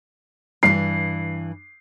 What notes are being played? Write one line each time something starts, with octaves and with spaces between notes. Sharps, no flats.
G2 E3 C7